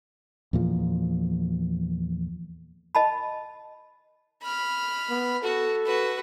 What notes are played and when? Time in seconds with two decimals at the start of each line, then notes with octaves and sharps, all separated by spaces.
0.53 E2 A#2 F3
2.95 D#5 A5 B5
4.42 B5 F6
5.09 B3
5.43 F#4 A4
5.86 F#4 B4